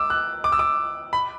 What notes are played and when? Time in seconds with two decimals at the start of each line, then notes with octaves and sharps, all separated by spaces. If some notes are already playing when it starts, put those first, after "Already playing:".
Already playing: D6 E6
0.10 F#6
0.44 D6
0.52 E6
0.59 D6
1.13 B5